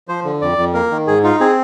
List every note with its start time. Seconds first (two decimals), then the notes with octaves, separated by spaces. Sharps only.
0.08 F3 C5
0.25 D3
0.41 F2 D5
0.58 F2
0.74 A#3 A#4
0.91 D#3
1.07 G#2 G#4
1.24 D#4 F4
1.40 C4 G#4